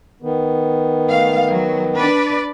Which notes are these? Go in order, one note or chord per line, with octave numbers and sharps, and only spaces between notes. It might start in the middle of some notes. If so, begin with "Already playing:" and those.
D#3 B3
A3 F5
F#3
D4 B4 D5